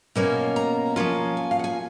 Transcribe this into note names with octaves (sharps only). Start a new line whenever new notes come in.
B2 A#3 C#4 F4 G#5
A#5
F3 A#3 C#4 F4 G#5
G#5
F5
F#5
G#5